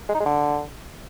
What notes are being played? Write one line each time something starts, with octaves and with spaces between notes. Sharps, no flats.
G#3
D#4
G#3
D3